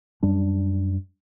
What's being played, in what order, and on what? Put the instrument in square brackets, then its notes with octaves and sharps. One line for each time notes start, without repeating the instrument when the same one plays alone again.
[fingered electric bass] F#2 G3 D4